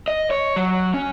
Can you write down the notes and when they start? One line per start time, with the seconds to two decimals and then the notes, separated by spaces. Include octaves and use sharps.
0.08 D#5
0.31 C#5
0.56 F#3
0.94 C#4